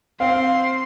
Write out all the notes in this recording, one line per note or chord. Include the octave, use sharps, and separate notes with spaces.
C4 F5 C6